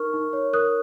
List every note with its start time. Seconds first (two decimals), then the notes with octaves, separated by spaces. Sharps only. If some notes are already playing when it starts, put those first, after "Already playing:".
Already playing: D#4 A#4 C#6 F6
0.13 D#4
0.33 C#5
0.53 A#4 D#6 F#6